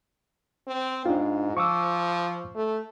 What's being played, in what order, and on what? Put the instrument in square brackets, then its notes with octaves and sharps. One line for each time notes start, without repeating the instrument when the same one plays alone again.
[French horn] C4
[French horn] G#2 [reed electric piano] D4 F4
[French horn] F3 [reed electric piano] C#6 D6 E6
[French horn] A3